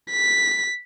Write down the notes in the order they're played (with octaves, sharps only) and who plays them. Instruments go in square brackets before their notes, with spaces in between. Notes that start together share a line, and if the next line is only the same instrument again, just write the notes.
[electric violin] B6